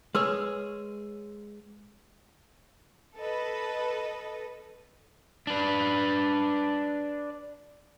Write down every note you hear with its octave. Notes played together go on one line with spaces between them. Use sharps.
G#3 G#4 B4 C#5 E6
A4 B4 D#5
D4 B4